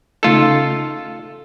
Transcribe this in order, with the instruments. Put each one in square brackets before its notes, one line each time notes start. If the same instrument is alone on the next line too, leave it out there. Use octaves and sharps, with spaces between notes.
[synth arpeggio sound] C#3 A3 D#4 [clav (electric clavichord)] F4 A4